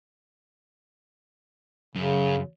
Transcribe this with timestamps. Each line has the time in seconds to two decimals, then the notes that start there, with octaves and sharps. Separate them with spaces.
1.95 F#2 C#3